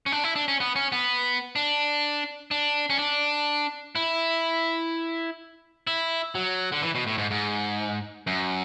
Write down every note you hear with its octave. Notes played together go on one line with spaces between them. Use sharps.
C#4
D4
E4
D4
C#4
B3
C#4
B3
D4
D4
C#4
D4
E4
E4
F#3
D3
E3
B2
A2
G#2
G#2
F#2